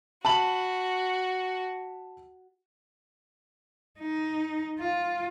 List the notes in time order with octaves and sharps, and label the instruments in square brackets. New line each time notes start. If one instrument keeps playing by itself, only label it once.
[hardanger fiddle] F#4 [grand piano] A5 B5 F#7
[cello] D#4
F4